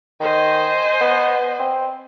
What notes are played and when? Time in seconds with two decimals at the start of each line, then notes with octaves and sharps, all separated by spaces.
0.21 D#3 C5 D#5 G#5
1.01 B3
1.60 C4